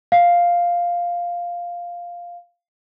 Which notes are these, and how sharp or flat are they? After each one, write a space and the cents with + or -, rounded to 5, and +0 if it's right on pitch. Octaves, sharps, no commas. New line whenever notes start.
F5 +0